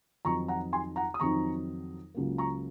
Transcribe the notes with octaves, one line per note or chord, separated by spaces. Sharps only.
F2 D#3 F#3 C4 D#4 A#5 C#6
F#5 A#5
G#5 C6
F#5 A#5
D#6
F2 D#3 F#3 C4 D#4 A#5 C#6
C#2 C#3 F#3 A#3
A#5 C#6